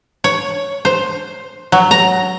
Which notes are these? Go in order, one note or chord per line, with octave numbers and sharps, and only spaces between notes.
C#5
C5
F#3
A#5